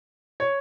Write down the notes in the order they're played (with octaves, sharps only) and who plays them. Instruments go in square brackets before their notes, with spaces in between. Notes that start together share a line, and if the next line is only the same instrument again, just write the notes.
[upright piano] C#5